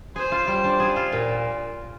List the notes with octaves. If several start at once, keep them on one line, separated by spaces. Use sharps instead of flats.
G#4 C5
F4
G3
D4
G#4
F4
A#2